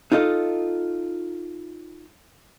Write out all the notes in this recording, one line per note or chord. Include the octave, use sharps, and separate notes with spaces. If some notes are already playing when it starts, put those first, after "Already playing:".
D#4 F4 A4 D#5